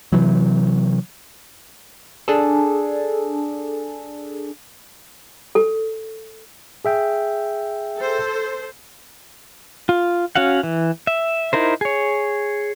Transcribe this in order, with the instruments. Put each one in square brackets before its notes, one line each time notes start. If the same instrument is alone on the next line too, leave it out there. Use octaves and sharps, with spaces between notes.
[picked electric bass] C3 E3 F#3
[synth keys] D4 G#4 A4
[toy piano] A4
[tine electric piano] G#4 E5 G5
[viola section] A4 C5
[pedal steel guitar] F4
C#4 F#4 F5 F#5
E3
E5
D#4 E4 A#4 C5
G#4 C#5